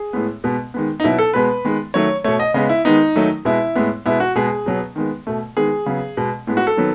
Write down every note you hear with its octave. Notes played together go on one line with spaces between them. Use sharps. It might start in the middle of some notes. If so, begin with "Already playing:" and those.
Already playing: G#4
A2 G#3 B3
B2 G#3 B3
D#3 G#3 B3
D#4
B2 F#3 B3 E4
A4
B2 G#3 B3 B4
D#3 G#3 B3
D#3 F#3 A3 C#5
B2 A3 C#5
D#5
C#3 G#3 B3 D#5
E4
D#3 G#3 B3 D#4
D#3 F#3 A3
B2 G#3 B3 E4
A2 G#3 B3
B2 G#3 B3 E4
F#4
B2 G#3 B3 G#4
B2 F#3 B3
D#3 G#3 B3
B2 A3
D#3 G#3 B3 G#4
C#3 F#3 B3
B2 G#3 B3
A2 G#3 B3
F#4
A4
D#3 F#3 B3